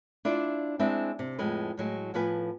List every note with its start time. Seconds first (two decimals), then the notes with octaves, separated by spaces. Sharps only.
0.25 D4 E4 F4 D5
0.79 G#3 C4 D4 E4 E5
1.19 C3
1.39 F2 A2 G#3 B4
1.77 A2 F#3 G#3
2.14 A2 F3 B3 B4 G#5